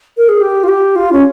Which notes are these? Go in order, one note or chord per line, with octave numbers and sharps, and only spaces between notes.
A#4
G#4
G4
F4
G4
F4
C#4